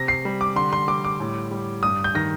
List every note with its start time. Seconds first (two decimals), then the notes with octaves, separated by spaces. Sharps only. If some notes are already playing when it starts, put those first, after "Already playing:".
Already playing: C3 A#6
0.08 C7
0.25 G3
0.41 D6
0.56 D3 C6
0.73 C6
0.88 G3 D6
1.04 D6
1.20 A2
1.51 G3
1.83 G2 D#6
2.04 G6
2.15 D#3 A#6